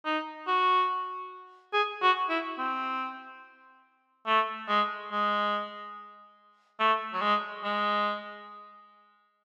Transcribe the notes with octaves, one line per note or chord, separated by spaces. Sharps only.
D#4
F#4
G#4
F#4
E4
C4
A3
G#3
G#3
A3
F#3
G#3
G#3